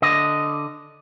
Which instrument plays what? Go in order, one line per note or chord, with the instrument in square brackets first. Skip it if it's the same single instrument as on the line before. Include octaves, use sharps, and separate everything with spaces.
[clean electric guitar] D3 D#5